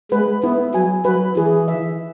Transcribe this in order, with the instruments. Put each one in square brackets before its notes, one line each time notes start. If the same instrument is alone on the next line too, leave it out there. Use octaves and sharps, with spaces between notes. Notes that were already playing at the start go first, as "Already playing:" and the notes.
[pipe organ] G#3 [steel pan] B4
[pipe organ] B3 [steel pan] E4
[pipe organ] F#3 [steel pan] G#5
[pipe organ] F#3 [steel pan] B4
[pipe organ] E3 [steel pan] G#4
[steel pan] E5